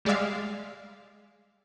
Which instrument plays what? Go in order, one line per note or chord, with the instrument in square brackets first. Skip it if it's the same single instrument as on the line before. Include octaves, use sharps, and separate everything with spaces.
[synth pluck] G3 G#3 D5 E5 F5